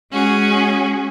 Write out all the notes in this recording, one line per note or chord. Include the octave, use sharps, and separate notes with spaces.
G#3 C#4 F#4 G#4